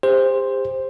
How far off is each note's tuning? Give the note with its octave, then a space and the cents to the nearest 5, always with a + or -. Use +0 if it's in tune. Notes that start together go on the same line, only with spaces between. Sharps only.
G4 +40 C5 +0